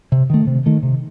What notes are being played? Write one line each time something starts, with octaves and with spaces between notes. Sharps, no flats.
C3
D#3 A3
C3
D#3 A3
C3